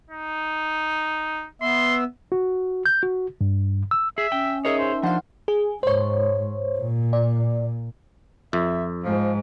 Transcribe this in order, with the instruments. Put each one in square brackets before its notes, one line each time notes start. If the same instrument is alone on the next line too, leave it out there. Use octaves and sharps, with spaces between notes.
[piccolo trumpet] D#4
[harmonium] B3 E5 [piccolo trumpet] C6
[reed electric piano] F#4
G6
F#4
G2
E6
[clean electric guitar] G#4 [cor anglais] E5
[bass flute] C#4 [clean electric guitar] G5
[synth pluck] D#4 A#4 E5 [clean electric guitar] G#4 C#5 [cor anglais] D#5
[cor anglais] C5
[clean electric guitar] F3 D4 [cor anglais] C5 [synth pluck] F5 F#5
[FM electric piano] G#4
[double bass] G#2 [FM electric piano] C5 C#5
[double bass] A#2
[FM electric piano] D5
[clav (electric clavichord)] F2 [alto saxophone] E5
[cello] G#2 [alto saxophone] F3